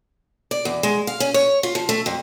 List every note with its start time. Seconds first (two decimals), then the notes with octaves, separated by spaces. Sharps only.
0.51 D5
0.65 E2
0.83 G#3
1.07 F5
1.20 C#4
1.34 C#5
1.63 F4
1.75 F3
1.89 A3
2.06 F2